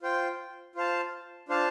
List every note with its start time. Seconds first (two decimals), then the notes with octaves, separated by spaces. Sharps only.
0.02 F4 C5 G5
0.75 F4 C5 F5 A5
1.49 D4 F4 C5 F5 A5